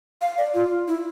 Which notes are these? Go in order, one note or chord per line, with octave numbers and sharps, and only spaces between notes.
F5
D5
F4
E4